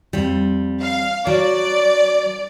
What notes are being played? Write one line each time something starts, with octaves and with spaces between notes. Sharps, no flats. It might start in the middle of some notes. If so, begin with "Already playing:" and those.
F2 G3
F5
F#3 D5